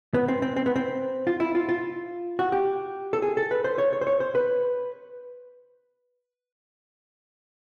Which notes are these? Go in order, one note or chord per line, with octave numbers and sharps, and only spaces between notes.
B3
C4
C4
C4
B3
C4
F4
E4
F4
F4
F#4
G4
A4
G#4
A4
B4
C5
C#5
C#5
C5
C#5
C5
B4